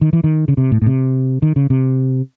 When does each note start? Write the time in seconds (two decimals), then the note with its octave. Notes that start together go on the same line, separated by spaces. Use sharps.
0.01 D#3
0.13 E3
0.24 D#3
0.48 C#3
0.57 C3
0.72 A2
0.82 A2
0.86 C3
1.42 D#3
1.56 C#3
1.70 C3